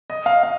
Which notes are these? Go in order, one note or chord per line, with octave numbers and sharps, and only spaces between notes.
D#5
F5
F5